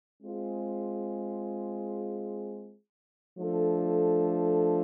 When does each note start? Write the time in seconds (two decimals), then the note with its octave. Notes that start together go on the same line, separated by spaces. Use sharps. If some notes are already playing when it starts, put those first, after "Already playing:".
0.22 G#3 C4 F4 G#4
3.38 F3 A3 D4 A4